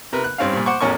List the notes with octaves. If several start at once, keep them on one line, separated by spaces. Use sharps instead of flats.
C3 A#4 B4
F#6
G2 C4 C#4 F5
G2 A#2
C5 F#5 C#6 D6
A1 E2 C#4 A#4 C#6